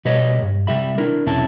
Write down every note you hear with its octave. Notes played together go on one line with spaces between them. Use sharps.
B2 G3 B4 C#5 D#5
G2
C3 F#3 G3 G4 E5 B5
D4 E4 A#4
B1 E2 C3 C#4 E4 A5